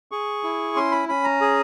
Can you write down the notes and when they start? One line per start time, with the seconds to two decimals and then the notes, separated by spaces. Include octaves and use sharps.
0.11 G#4 C#6
0.44 E4
0.76 C#4 C6
0.92 B5
1.08 C#4 B5
1.24 A#5
1.41 G#4